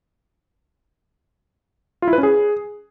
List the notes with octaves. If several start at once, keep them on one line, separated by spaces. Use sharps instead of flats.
F4
E4
B4
C#4
G#4